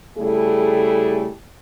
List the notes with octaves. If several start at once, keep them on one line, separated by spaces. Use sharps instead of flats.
C#3 G3 A3 E4 G#4 A4